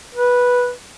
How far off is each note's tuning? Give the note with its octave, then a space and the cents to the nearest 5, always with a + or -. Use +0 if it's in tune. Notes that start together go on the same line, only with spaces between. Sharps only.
B4 -10